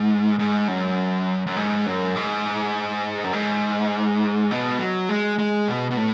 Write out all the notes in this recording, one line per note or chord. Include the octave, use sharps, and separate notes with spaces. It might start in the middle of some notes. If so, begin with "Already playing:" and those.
Already playing: G#2
G#2
F#2
F#2
G#2
F#2
G#2
F#2
G#2
B2
F#3
G#3
G#3
B2
B2
A2